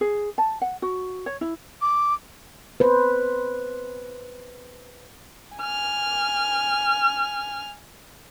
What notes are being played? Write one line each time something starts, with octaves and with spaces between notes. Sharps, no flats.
G#4
A5
F#5
F#4
C#5
E4
D6
B4 C5
G#5 F6